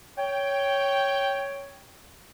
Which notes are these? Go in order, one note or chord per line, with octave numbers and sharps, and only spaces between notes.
C#5 G5